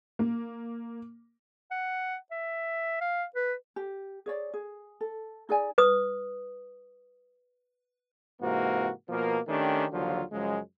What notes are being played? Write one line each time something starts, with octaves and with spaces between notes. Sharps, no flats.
A#3
F#5
E5
F5
B4
G4
G#4 C#5 D5
G#4
A4
D#4 G#4 D5 G#5
B4 D#6
G#2 C3 E3 A#3 F#4
B2 F3 A#3
D#3 A3 C#4 D4 G4
D#2 D3 F3 F#3 F4
F#2 C#3 F3 G#3